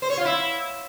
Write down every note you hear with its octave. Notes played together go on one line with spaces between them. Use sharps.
C5
C#5
F4
E4